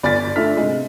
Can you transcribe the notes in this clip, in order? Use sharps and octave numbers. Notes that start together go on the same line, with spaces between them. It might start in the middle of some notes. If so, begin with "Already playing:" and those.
G1 D5 G#5 F6 A6 B6
A3 D4 F4 E5 F6 B6
C3 G#3